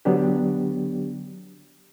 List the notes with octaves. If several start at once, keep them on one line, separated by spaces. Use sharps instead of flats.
D3 F#3 B3 D4 G4